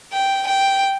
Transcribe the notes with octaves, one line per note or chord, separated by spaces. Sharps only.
G5
G5